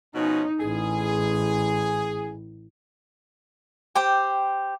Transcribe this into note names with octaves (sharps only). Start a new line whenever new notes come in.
B2 F3 C#4 D#4
A1 G#4
G4 C5 G5